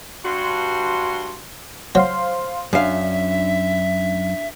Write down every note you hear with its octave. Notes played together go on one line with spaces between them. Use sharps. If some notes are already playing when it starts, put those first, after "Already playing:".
G2 F#4 C6
F#3 C5 F5 C6
F#2 D4 E5 F5